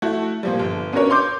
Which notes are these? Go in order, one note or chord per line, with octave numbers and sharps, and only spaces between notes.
A3 E4 F#4
A#2 F3 G3
G1
B3 C#4 D4 F#4 A#4 C#5
C#5 C6 D6 G6